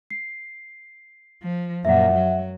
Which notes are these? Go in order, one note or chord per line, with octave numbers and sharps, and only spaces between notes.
C7
F3
F#2 A#2 E5 F#5
F#3